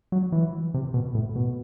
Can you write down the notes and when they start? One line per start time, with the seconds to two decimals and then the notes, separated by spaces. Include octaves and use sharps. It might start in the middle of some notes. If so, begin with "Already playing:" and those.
0.12 F#3
0.32 E3
0.74 C3
0.94 B2
1.15 A2
1.36 B2